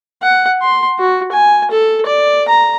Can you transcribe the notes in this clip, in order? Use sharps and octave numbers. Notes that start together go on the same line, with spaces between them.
F#5
C6
F#4
G#5
A4
D5
A#5